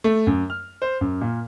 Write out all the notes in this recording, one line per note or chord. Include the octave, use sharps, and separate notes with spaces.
A3
F#2
F6
C5
F#2
A#2